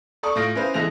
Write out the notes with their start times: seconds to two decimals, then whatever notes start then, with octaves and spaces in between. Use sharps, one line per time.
0.23 A4 D5 C#6 D#6
0.36 A2 F4 A#6 D7
0.55 C#4 E4 B4 C5 F5
0.74 D3 E3 G#3 A#6 F7